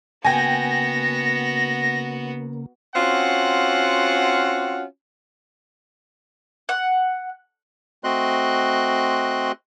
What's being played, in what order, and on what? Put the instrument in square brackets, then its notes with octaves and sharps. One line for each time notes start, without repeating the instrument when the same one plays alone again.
[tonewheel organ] C#3 A#3 [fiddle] B3 F#4 [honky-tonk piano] G5 G#5 [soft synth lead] A#6
[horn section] C4 C#4 F4 F#4 F#5
[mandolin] F#5
[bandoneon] A3 C4 F#4 D#5 C6 F#6